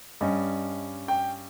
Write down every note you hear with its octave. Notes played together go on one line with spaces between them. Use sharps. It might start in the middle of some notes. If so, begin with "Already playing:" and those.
G2 G3 C#4 D#5
G5